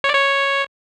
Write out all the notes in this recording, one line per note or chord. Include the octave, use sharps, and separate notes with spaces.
C#5
D5
C#5